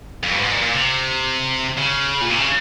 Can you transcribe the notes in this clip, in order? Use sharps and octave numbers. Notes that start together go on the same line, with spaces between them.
F2
G2
G#2
A#2
A#2
C3
C#3
A#2
C3
C#3